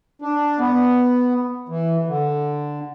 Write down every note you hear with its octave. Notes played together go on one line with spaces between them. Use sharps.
D4
B3
E3
D3